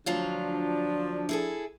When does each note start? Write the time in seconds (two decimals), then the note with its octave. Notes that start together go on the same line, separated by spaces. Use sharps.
0.06 D2 F3 F#3 D4 F4
1.29 E4 G#4 A4